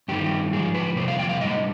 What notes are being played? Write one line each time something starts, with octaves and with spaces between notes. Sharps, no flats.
G2 D#3 G3 G4
G#2 F3 G#4
B4
F2 C3 G3 C5
F5
G5
F5
G#2 G3 D#5